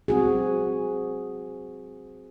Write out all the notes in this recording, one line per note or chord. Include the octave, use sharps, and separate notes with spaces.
C4 F#4 G#4